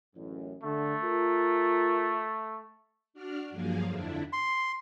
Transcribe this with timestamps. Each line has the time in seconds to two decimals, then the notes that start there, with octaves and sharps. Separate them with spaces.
0.15 A1 F#2
0.63 D3 A3
1.03 F4 A#4
3.14 D4 F#4 D5 F6
3.50 G2 F3 F#3 A#3 G#4 F5
3.89 F2 D3 D4 E4
4.33 C6